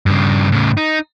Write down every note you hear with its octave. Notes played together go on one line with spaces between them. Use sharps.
G2 C#3
A2 C#3
D#4